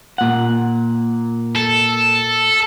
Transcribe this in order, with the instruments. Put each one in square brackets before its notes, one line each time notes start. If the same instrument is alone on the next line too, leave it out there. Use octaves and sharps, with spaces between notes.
[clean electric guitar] A#2 F#5
[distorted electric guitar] A4